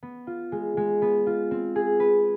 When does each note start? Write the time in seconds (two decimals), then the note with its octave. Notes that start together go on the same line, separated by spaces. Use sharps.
0.03 B3
0.27 F4
0.52 G#3
0.77 G#3
1.02 B3
1.27 F4
1.51 C4
1.76 G#4
2.00 B4